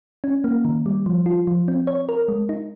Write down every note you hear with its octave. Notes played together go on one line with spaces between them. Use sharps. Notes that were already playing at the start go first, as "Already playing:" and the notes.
C#4
A#3
D#3
G3
F3
F4
F3
C4
C#5
A#4
G#3
D#4